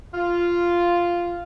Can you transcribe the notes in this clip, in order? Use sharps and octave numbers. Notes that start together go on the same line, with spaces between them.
F4